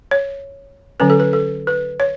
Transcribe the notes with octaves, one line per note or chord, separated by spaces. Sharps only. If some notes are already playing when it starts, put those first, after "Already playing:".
C#5
D3 F#3 C#4 B4
A4
B4
A4
B4
C#5